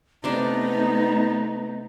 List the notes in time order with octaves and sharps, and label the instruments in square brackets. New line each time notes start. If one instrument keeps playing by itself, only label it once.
[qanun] C3 D4 D5 [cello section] A3 B3 D#4 [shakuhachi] A#5